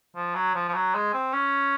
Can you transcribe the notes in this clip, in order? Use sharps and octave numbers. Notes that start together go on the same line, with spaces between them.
F3
F#3
F3
F3
F#3
G#3
C4
C#4